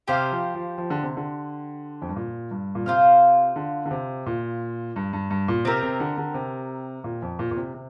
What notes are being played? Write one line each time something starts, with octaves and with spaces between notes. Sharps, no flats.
C3 G4 C5 F5
F3
F3
F3
D3
C3
D3
F2
G2
A#2
G2
A#2
C3 F4 C5 F5
D3
D3
C3
A#2
G2
G2
G2
A#2
C3 C4 G4 A#4
C3
D3
D3
C3
A#2
F2
A#2
A#2
C3
C3